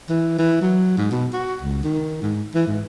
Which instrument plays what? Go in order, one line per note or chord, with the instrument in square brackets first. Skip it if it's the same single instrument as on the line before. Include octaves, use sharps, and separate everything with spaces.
[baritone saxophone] E3
E3
F#3
G#2
B2
F#4
C#2
D#3
G#2
E3
G#2